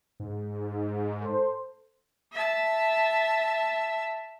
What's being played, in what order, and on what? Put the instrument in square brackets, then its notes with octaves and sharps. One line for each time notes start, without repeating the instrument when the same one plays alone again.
[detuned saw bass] G#2
[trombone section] A4 C5
[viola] E5 A5